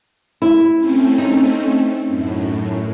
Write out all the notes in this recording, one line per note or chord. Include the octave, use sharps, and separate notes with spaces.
E4
A3 C4 C#4
D#4
F#2 A2